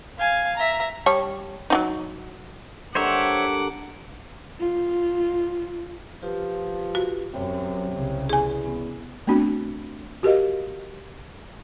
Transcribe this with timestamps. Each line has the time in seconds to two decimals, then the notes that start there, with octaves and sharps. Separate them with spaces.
0.18 F5 G#5
0.57 E5 A#5
1.06 G3 C#5 A5
1.70 F#3 D4 D#4
2.95 D3 G3 A#4 C5 C#5 E5 F#5 D6
4.60 F4
6.23 F3 F4 G4 B4
6.95 F#4
7.34 F#2 C3 C#5
7.95 C2 C#3
8.29 E2 G#4 G#5
8.65 B3
9.27 A3 B3 C4 D4 F#4
10.23 F#4 G4 A#4 D#5 F5